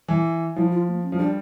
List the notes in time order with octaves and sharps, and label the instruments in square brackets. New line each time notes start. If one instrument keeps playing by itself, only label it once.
[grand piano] E3
[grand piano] F3 [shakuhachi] E4
[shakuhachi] F4
A#3
C#4
[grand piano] F3
[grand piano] G3 [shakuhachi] D4